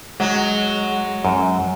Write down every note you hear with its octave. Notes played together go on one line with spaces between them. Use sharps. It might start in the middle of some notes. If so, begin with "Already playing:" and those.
F#3 G#3
F#2